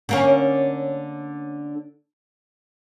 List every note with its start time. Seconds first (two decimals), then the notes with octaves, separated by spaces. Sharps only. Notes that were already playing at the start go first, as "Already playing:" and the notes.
0.09 D3 A#3 C#4